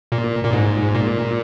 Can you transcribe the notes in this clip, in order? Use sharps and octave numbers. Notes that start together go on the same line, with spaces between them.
A#2
A#2
G#2
A#2